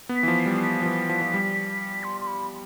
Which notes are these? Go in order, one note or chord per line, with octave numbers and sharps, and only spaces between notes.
B3
B6
E3
F3
C7
G3
C7
B6
F3
E3
F3
F3
G3
C6
C6
B5